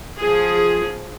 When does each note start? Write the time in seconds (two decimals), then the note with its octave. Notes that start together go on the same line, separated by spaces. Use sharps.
0.18 F3 G#4